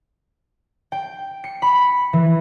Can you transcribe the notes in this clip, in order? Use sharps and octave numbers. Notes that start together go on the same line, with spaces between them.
G5
C#7
B5
E3